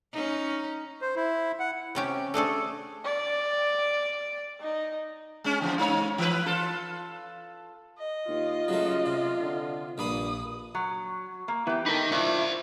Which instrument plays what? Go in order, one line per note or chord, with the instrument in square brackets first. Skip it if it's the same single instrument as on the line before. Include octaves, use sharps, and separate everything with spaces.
[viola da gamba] C#4 D#4
[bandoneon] C5
E4
F#5
[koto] C3 C#4 G4
A3 D4 G#4 A4
[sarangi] D5
D#4
[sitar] G#3 C#4
E2 C#3 F3
G#3 D#4 C#5
E3 B4
F4 A4
[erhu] D#5
[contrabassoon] D#2 [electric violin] F4
[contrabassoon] C#3 [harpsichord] F#3 A3
[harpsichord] C3
[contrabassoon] D3
[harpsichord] A#1 A#3 B5 [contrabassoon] G2 [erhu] D#6
[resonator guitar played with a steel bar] F#3
A#3
[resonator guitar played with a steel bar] E3 G4 [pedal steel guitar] B3 E4
[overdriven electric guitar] D#4 A#4 [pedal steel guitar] A4 G5 B5
[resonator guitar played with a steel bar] G2 E4 [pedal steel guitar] F4 [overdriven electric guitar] C5 D5